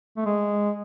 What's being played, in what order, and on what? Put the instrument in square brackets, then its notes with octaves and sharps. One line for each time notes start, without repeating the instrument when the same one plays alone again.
[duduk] A3
G#3